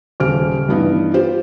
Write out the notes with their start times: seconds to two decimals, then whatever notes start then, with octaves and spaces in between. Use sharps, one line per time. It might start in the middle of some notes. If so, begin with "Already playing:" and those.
0.20 D#1 C#3 F6 D7
0.68 G2 E3 B3 D#4
1.14 F4 G4 C5